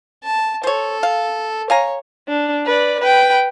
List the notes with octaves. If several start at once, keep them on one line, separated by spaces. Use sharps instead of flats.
A5
A4 C5 C#5
F5
C#5 F5 G#5 A#5
D4
B4 D5
B4 G5